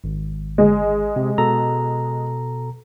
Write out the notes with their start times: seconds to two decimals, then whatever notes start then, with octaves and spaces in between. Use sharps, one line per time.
0.04 G#1
0.58 G#3
1.16 C3
1.38 B2 A4 A#5